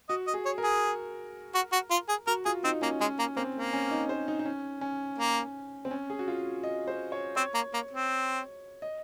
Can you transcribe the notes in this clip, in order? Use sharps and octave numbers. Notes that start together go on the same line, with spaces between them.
F#4 D#5
D#5
G#4
C#5
A#4
G#4
F#4
F#4
F4
G#4
F#4 A#4
F4 G#4
C4 D#4
A#3 C#4
G#3 C#4
A#3
A#3 C4
A#3
C#4
D#4
C5
D#4
D#4
C#4
C#4
A#3
C4
C#4
G#4
F#4
F4
D#5
C5
C#5
C4 C#5
A#3
A#3
C4
D#5